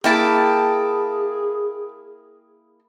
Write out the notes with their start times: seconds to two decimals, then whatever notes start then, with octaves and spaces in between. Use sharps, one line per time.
0.04 A#3 E4 G#4 G5 A5